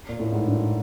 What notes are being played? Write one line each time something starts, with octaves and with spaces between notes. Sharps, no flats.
A#2
A2
G#2
G2